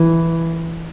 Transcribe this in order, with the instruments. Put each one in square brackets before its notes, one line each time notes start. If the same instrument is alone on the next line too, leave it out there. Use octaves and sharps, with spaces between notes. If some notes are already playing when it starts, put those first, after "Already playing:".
Already playing: [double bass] E3